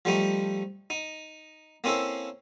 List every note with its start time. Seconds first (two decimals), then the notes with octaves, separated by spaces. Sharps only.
0.05 F3 G3 A3 D#4
0.90 D#4
1.84 A#3 C4 C#4 E4 A4